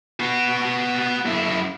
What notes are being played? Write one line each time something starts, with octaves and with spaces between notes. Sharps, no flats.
B3 F#4
F#2 E4